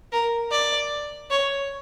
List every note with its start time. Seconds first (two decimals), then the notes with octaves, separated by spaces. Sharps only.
0.12 A#4
0.51 D5
1.30 C#5